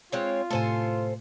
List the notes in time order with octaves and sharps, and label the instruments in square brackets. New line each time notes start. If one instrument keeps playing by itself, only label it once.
[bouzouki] G#3 C4 C#5 [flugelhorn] F4
[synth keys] A2 C3 A3 [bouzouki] A4 C5 G#5